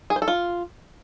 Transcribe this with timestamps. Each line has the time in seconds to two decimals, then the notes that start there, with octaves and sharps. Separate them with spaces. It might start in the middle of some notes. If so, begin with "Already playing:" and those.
0.10 G#4
0.16 C5
0.22 A4
0.28 F4